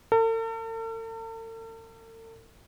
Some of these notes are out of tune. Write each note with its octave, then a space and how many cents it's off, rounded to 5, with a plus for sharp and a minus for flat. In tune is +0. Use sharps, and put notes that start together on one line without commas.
A4 +45